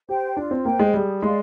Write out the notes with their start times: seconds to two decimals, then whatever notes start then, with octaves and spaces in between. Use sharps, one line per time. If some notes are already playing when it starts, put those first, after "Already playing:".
0.09 G4 C5 G5
0.37 D4 F4
0.51 C4
0.65 A#3 C5 G5
0.79 G#3
0.94 G3 G#4
1.22 G#3 D5 F5 C6